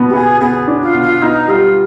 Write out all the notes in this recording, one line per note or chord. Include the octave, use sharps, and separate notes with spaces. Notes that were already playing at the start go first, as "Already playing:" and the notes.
Already playing: B2 B3
G4
B3 G#4
B3 G#4
D4
F4
B2
F4
B3 D#4
G3 F4